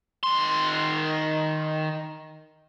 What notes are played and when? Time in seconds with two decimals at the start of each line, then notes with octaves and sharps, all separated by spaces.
0.23 D#3 C6